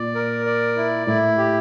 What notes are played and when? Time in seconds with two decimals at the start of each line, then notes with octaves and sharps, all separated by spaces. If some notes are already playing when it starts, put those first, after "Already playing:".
Already playing: A#2 D5
0.15 A#4
0.46 D5
0.77 E4
1.07 A2 E4
1.38 G4